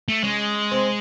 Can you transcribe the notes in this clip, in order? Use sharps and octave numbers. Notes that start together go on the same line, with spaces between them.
A3
G#3 C#4
C4